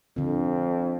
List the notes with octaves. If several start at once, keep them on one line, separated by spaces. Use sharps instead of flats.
F2 D3 C4